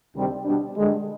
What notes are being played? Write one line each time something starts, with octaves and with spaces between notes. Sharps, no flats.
D2 C3 D#3 G3 C4
B2 G3 D4
G2 D3 G#3